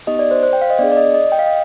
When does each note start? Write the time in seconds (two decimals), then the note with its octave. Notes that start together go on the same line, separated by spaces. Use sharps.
0.07 B3 D#4 G4 D#5
0.19 D5
0.31 C5
0.43 C5
0.53 G5
0.62 F5
0.70 D#5
0.79 B3 D4 G#4 D5
0.92 D5
0.97 D#5
1.14 D#5
1.32 G5
1.39 F5
1.46 D#5